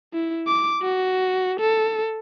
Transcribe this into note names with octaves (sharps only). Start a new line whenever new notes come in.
E4
D6
F#4
A4